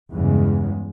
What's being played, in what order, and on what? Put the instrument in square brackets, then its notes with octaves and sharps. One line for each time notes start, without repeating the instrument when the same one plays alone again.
[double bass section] E2 G2 C#3 G#3